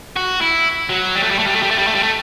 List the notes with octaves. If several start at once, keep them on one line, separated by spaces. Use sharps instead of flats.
F#4
E4
F#3
G3
A3
G3
A3
G3
A3
G3
A3
G3
A3
G3
A3